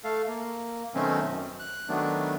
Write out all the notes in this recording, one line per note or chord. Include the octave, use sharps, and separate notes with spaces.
A3 A4 F5
A#3
B2 D#3 F#3 A3 C4 C#4
F#2
F#6
D#3 F#3 A3 B3 D4